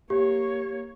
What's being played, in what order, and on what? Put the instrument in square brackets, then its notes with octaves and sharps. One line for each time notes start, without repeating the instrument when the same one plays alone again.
[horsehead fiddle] A#3 C#5 [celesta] G4